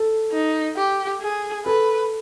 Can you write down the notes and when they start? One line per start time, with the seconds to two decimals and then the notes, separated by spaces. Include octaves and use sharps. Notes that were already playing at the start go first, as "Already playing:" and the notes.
Already playing: A4
0.32 D#4
0.76 G4
1.22 G#4
1.66 A4 B4